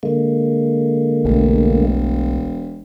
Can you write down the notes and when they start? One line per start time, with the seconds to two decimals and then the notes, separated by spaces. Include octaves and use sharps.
0.03 D3 G#3 A#3
1.25 E1 B1 A3